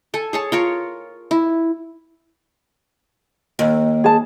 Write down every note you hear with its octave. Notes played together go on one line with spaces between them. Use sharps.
A4 G#5
G#4 C#5 A5
F4 A#4 C#5
E4
D#2
G#4 A5